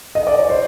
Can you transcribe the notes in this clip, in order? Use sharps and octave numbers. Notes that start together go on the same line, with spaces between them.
D#5
D5
C#5
C5